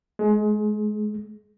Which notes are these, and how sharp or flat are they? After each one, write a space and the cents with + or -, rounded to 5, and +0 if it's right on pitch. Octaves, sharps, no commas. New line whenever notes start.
G#3 +30